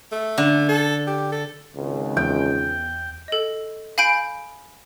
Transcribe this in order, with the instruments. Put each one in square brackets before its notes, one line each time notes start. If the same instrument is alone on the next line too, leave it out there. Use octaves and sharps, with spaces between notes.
[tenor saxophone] A3
[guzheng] D3
[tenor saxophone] A4
G4
A4
[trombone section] G#1 C#2
[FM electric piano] E2 [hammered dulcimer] G5
[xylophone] A4 D#5
F5 G#5 B5 G6 D7